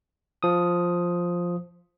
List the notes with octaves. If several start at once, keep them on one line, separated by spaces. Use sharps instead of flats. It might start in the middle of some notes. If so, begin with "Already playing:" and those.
F3 D#6